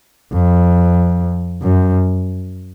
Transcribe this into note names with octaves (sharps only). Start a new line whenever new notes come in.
F2
F#2